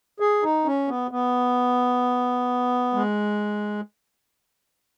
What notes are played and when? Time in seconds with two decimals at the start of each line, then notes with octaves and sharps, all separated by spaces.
0.20 G#4
0.43 D#4
0.66 C#4
0.88 B3
1.11 B3
2.94 G#3